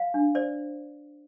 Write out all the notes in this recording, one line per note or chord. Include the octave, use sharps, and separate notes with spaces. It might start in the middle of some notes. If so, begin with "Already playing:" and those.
Already playing: F5
D4
C5 D5